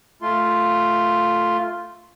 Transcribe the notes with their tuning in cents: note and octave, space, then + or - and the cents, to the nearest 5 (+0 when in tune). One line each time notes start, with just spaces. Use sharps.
A3 +0 F4 +0 C6 +0